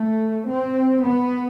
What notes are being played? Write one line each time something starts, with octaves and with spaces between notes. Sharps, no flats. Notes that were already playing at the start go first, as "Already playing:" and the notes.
Already playing: A3
C4
B3